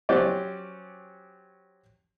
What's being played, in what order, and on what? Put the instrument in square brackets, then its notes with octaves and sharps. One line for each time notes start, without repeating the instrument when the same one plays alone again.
[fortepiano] F#3 C#4 G4 C5 D5